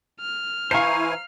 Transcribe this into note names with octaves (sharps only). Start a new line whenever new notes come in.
F6
E3 E4 C5 F5 G#5 A#5 C#6 C7